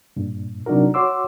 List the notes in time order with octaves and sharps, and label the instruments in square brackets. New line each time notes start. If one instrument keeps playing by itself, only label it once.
[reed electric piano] G2 A#2
C3 F#3 D4 D#4 F#4 A#4
F#4 C#5 F#5 C6 D6 E6